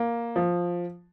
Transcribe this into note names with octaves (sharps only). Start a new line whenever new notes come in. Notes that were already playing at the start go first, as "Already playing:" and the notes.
Already playing: A#3
F3